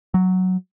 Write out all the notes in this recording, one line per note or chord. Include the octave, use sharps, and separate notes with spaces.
F#3